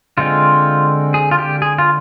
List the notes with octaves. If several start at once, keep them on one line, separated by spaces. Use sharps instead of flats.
D3 G#3 C4 F4
G#4
F4
G4
G#4
F4